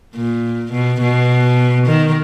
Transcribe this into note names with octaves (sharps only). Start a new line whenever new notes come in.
A#2
B2
B2
D#3